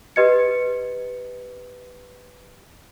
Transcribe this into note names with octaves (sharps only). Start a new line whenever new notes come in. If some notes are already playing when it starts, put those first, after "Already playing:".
G4 B4 D#5 G#6 C#7